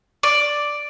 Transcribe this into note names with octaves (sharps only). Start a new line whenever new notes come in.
D5